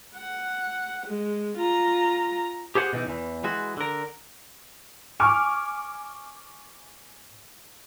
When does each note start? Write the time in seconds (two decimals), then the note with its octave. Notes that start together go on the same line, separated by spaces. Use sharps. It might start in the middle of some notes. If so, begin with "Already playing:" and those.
0.16 F#5
1.07 G#3
1.57 F4 A#5
2.75 G4 G#4 C5 F#5
2.93 B2 E3 D#4
3.07 E2 E3
3.44 E3 G#3 F#4
3.77 D3 A#4
5.20 G#5 C#6 D6 F6